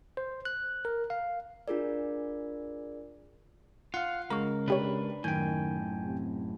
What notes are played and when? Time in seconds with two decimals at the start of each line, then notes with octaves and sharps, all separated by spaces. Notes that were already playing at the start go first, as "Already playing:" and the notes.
0.17 C5
0.45 F#6
0.85 A#4
1.10 F5
1.68 D4 F4 G#4 A#4 D5
3.94 F4 F5 F#5
4.30 C#3 G#3 A#4 A#5 C#6
4.68 C3 D4 G4 B4 C#5
5.24 F#2 A2 D#3 G5 G#5 G6
6.04 C3